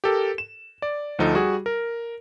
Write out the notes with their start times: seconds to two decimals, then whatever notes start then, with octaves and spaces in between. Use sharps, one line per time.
0.04 G4 A4 A#4
0.38 E7
0.82 D5
1.19 D2 F3 D#4 A4
1.34 G3 F#4 G#4
1.66 A#4